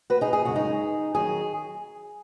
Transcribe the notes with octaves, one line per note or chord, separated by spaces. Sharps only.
F#4 B4
D#4 G#4
G#4
F#2 C#3 G#3 F#4
D#4 G#4
D#3 F#3 G#4